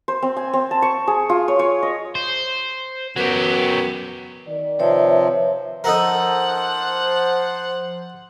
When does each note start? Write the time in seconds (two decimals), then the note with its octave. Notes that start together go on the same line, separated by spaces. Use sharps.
0.08 C5
0.22 C4
0.37 G#5
0.53 C4
0.71 A5
0.82 C#6
1.07 G#4
1.29 F4
1.48 C#5
1.59 C#5
1.83 D#5
2.15 C5
3.17 F#2 F#3 B3 F#4 G4
4.47 D#3 D5
4.79 C3 F3 C4 B4 C#5 E5
5.84 F3 D#4 A4 A#4 C5 F#5